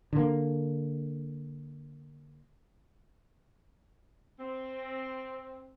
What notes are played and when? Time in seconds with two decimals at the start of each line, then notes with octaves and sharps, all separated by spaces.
0.13 D3 A#3
4.39 C4